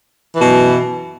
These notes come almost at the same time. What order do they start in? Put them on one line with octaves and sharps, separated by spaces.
E3 F#2 B2